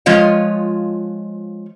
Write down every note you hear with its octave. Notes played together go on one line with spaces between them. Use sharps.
F3 G#3 F4 C#5 D#5 F5